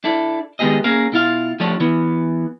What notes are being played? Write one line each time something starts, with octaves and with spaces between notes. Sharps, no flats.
D4 E4 A4 D5
D#3 G#3 B3 G4 G#4 D#5
A#3 C#4 G#4 A#4 F5
B2 E4 F4 F5
F3 A3 D4 G4 C#5
E2 E3 B3